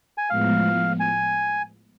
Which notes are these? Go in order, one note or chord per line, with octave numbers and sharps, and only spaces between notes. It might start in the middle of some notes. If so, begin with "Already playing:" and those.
G#5
A2 F3 G#3 B3 F5
G#5